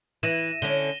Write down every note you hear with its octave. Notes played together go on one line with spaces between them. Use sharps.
E3 A#6 D#7 E7
D3 C#4 G7